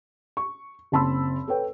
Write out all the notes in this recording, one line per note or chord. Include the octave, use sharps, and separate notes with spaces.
C#6
F#1 C4 A5 B5 C6 E6
A4 B4 C#5 G5